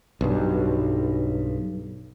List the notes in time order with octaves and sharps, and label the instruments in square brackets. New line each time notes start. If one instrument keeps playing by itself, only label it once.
[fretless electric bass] B1 G2